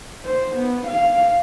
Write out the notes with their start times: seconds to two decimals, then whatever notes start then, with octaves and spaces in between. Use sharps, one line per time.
0.24 C5
0.56 B3
0.87 F5